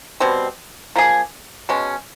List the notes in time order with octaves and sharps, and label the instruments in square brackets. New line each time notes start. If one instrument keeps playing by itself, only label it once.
[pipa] B2 G3 C4
F3 A#3 D#4 G#4
B2 G#3 C#4